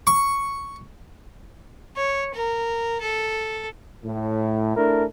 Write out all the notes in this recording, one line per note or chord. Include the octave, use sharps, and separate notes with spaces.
C#6
C#5
A#4
A4
A2
A3 D4 E4 A#4